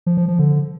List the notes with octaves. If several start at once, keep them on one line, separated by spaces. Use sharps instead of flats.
F3
F3
F3
D3